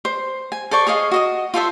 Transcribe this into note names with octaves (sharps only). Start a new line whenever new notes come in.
C5
G#5
A4 C5 D5 C#6
G#4 C#5 D#5 F5
F#4 D#5 D#6
F4 A4 C5 E5